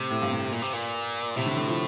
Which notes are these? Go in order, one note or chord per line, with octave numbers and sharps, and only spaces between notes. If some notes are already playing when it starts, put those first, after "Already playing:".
Already playing: A2 C3
A2
G2
A2
A#2
C3
A#2
A2 C3
D3
D3
F3